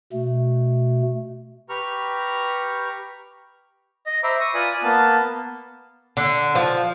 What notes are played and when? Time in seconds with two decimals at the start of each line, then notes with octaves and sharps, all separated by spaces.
0.13 B2 A3
1.69 G4 B4 A#5 C#6 F6
4.06 D#5
4.23 C5 E5 A#5 B5 D6
4.40 C#6 D#6
4.54 F4 B4 D5 G#5 D#6
4.83 A#3 B3 A5
6.17 D3
6.55 F3